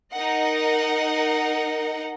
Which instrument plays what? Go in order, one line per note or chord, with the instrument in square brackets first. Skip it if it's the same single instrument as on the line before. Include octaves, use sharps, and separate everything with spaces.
[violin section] D#4 A#4 D#5 F#5